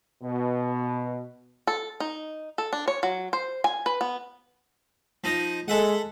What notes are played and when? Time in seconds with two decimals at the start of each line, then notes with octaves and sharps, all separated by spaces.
0.23 B2
1.67 A4
2.00 D#4
2.58 A4
2.73 D4
2.88 C#5
3.03 F#3
3.33 C5
3.64 G#5
3.86 B4
4.01 B3
5.24 F3 D#4 D#5
5.68 G#3 A4 E5 F#5